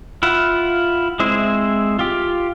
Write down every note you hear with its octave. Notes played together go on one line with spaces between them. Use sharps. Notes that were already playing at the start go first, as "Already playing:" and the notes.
E4 F4 F#5
G#3 C4 E4 C5
F4 G4